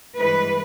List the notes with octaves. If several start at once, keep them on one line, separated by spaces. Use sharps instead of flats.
G2 E3 G#3 B4